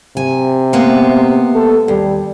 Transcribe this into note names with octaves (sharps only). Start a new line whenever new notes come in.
C3 G#5
G#3 A#3 B3
A4
D#2 G3